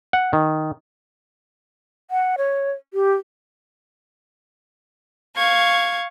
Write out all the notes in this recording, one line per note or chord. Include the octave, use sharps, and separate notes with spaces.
F#5
D#3
F#5
C#5
G4
F5 C#6 G#6